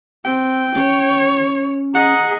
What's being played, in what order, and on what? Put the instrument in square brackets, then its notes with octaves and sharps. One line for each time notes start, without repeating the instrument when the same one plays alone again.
[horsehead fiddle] C4 [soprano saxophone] G5
[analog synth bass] C#4 [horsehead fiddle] C#5
[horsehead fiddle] G#4 D#5 [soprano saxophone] F#5 [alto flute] A#5